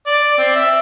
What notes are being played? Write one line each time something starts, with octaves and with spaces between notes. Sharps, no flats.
D5
C4
E5